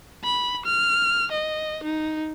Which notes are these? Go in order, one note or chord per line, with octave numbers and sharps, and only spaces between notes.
B5
F6
D#5
D#4